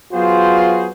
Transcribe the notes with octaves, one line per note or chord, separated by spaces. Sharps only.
F#3 B3 F4 F#4 G#4 C5